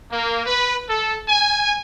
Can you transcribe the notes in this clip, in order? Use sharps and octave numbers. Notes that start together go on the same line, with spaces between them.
A#3
B4
A4
G#5